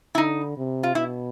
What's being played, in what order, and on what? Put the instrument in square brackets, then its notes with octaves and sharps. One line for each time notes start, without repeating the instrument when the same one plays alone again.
[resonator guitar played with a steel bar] E4
[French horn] D3 [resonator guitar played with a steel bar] D#4
[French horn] C3
[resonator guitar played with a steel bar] F4
[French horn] B2 [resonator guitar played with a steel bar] E4